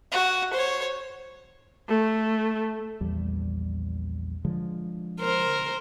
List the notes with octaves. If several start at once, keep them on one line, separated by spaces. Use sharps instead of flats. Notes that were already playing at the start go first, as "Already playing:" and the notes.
F#4
C5 C#5
A3
A#1 E2 G3
D3 F3 G#3
A#4 C5